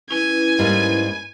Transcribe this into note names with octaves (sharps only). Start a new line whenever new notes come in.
C#4 E4 B4 G#5
G#2 G3 A#3